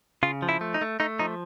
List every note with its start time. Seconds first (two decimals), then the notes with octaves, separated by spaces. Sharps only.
0.23 C#3 F4
0.42 F3
0.49 E4
0.61 A3
0.74 D#4
0.81 A3
1.00 A3 D#4
1.19 F3 D#4